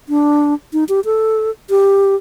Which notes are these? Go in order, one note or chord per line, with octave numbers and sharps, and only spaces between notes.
D4
D#4
G4
A4
G4